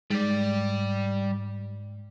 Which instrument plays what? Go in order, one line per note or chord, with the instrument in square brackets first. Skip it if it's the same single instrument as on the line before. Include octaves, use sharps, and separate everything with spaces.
[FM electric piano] G#2 [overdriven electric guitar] G3 D5